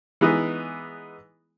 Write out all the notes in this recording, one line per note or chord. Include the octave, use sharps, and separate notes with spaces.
E3 G#3 B3 D#4